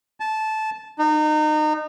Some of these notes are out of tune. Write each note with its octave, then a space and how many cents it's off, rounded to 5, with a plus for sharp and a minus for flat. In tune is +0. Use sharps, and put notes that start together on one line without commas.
A5 -15
D#4 -30